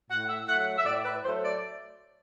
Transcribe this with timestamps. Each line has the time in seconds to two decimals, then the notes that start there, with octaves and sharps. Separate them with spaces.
0.10 A2 F#5
0.29 E5
0.48 F#3 A3 F#5
0.78 E5
0.85 A2 D5
1.04 B4
1.23 F#3 C5
1.28 A3
1.43 D5